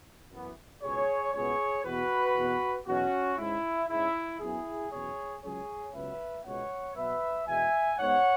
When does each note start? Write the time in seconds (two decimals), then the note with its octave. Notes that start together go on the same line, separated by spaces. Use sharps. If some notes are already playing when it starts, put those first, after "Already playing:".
0.31 F#2 E3 B3
0.82 C#2 B2 B3 G#4 C#5
1.33 C#2 B2 B3 G#4 C#5
1.84 E2 B2 B3 F#4 B4
2.36 E2 B2 B3
2.86 E2 B2 F#3 C#4 F#4
3.37 G#2 G#3 C#4 E4
3.89 G#2 G#3 C#4 E4
4.39 F#2 F#3 B3 E4 G#4
4.91 E2 B2 F#3 C#4 G#4 C#5
5.42 C#2 C#3 F#3 G#4 C#5
5.93 C#2 C#3 F#3 B3 B4 E5
6.44 C#2 B2 G#3 B3 C#5 F#5
6.96 B2 F#3 B3 B4 E5
7.46 E2 B2 G#3 E5 G#5
7.98 G#2 G#3 B3 C#5 F#5